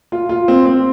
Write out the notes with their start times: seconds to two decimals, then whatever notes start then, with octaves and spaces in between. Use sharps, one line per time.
0.12 F4
0.29 F4
0.48 C4
0.66 C4